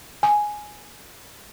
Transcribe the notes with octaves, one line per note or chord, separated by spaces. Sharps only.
G#5